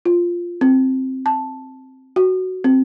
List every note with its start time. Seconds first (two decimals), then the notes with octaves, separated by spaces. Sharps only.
0.05 F4
0.61 C4
1.26 A5
2.16 F#4
2.64 C4